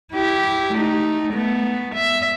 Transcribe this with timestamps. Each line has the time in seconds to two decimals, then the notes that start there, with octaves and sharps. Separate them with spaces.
0.14 E4 G4
0.73 A3 D#4
1.33 A3 B3
1.95 E5